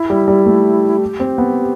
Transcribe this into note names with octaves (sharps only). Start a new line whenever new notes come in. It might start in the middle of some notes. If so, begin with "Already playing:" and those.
Already playing: E4
G3
G3
A3
G4
C4
B3